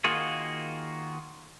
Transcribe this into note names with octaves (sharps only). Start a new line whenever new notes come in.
D#3 A#3 F4 F#4 G#4